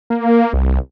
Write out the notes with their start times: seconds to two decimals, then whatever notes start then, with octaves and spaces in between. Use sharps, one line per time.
0.10 A#3
0.54 C2